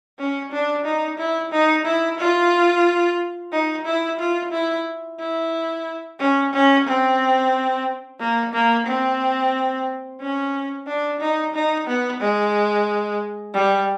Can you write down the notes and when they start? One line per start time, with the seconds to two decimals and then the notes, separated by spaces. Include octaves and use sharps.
0.19 C#4
0.52 D4
0.85 D#4
1.18 E4
1.52 D#4
1.85 E4
2.19 F4
3.52 D#4
3.85 E4
4.19 F4
4.52 E4
5.20 E4
6.19 C#4
6.53 C#4
6.87 C4
8.20 A#3
8.53 A#3
8.87 C4
10.21 C#4
10.87 D4
11.21 D#4
11.54 D#4
11.87 B3
12.21 G#3
13.54 G3